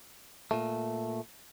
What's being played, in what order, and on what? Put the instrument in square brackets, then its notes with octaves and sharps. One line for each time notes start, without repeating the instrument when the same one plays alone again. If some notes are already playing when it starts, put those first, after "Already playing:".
[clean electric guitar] A#2 A3